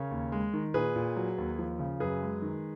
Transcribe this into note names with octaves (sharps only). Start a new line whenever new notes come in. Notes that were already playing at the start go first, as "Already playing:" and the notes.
Already playing: C#3 A#4 C#5
D#2
G#3
D#3
A#2 G#4 B4
A#2
F#3
D#2
F3
C#3
F#2 G#4 B4
G#3
D#3